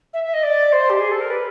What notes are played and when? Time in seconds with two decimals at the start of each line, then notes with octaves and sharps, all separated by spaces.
0.13 E5
0.23 E5
0.33 D#5
0.42 D5
0.72 C5
0.89 G4
0.99 G#4
1.10 A4
1.20 A#4
1.30 B4